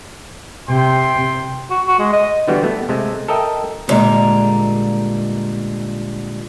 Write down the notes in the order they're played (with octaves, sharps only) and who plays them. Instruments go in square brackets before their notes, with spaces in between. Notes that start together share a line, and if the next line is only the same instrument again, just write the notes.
[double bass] C3 [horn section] G5 C6
[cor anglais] F#4
F#4
G#3
D#5
[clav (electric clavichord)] D3 E3 G3 B3 F#4
A3 B3
C3 G#3 A3
A4 A#4 D#5 E5 G5
[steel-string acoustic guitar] F2 A#2 D3 G3 G#3 A#5